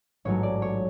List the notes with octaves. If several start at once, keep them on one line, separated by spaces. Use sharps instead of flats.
A1 G#2 F#3 C#5
D5
C#5